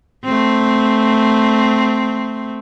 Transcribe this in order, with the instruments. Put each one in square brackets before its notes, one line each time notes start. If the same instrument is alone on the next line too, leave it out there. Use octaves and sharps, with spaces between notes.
[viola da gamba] A3 C4